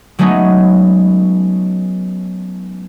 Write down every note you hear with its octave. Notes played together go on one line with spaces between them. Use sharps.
F#3 G#3 A3 B3 C#4 D#4